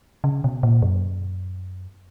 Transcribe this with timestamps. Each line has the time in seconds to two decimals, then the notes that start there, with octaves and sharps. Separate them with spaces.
0.24 C#3
0.44 B2
0.63 A#2
0.82 F#2